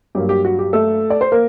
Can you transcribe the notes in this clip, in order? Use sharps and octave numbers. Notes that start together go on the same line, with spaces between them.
G2 F#3 A#3 G4
G4
F#4
G4
A3 A4
D5
C5
A#3 A#4